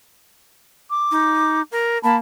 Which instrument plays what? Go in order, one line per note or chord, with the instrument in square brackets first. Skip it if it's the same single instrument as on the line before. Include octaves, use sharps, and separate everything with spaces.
[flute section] D6
[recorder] D#4
A#4
[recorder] A#3 [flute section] A5 B5